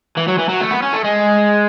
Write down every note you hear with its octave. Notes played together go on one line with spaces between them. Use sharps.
E3
F#3
E3
F#3
A3
B3
C#4
A3
G#3